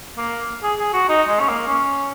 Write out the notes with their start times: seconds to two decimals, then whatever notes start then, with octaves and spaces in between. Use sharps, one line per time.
0.18 A#3
0.63 G#4
0.79 G#4
0.93 F#4
1.09 D#4
1.28 G#3
1.40 C#4
1.49 A#3
1.68 C#4